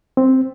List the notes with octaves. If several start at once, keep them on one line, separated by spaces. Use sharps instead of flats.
C4